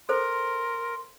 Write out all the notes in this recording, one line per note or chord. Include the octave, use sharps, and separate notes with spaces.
A4 A#4 C5 C6